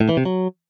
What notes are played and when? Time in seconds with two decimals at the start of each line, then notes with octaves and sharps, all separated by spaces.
0.01 A2
0.09 E3
0.17 C3
0.25 F#3